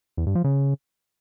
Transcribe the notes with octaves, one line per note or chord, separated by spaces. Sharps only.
E2
G2
F3
C#3